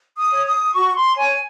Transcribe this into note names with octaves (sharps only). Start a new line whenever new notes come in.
D#6
C#5
D#6
F#4 C#6
C6
C#5 G#5